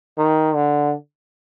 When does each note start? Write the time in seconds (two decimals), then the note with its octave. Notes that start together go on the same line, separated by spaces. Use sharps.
0.18 D#3
0.55 D3